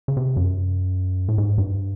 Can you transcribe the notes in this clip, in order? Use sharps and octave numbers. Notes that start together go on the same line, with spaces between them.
C#3
C3
F#2
A2
G#2
G2